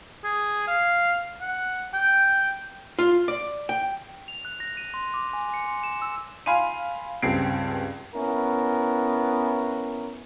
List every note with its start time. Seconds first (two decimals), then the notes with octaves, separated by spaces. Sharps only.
0.24 G#4
0.67 F5
1.41 F#5
1.93 G5
2.99 F4
3.28 D5
3.69 G5
4.28 F7
4.45 F#6
4.60 A#6
4.77 D#7
4.94 C6
5.14 D6
5.33 G#5
5.54 C#7
5.68 C6
5.83 E7
6.02 E6
6.46 F5 G#5 B5 C6 D#7
7.22 C#2 G2 C4 C7 D7
8.15 B3 C#4 E4 A#4